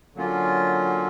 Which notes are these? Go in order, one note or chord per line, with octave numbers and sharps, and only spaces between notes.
D3 F#3 A#3 C#4 F4